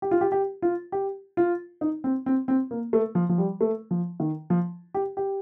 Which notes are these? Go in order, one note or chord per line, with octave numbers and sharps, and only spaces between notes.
G4
F4
G4
G4
F4
G4
F4
D#4
C4
C4
C4
A#3
A3
F3
F3
G3
A3
F3
D#3
F3
G4
G4